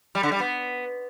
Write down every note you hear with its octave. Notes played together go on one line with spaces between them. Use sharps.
G3
D3
G3
B3